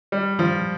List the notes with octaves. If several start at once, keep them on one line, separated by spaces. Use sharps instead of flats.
G3
F3